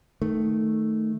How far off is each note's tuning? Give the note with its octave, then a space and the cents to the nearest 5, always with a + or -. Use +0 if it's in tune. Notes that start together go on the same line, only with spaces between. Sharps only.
D#3 +0 A3 +0